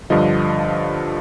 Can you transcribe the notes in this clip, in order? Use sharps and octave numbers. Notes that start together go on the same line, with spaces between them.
G2 D3 F3 D#5